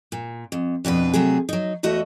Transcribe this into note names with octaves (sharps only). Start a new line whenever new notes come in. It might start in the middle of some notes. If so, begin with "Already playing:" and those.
A#2
F2
F2 B2 D4 B4
C3 F#3 A3 G#4
F#3 D#4
E2 A3 F#4 D#5 E5